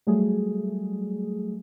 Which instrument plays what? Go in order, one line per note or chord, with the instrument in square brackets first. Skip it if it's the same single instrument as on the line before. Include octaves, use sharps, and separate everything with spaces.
[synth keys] F#3 G3 A3 G#4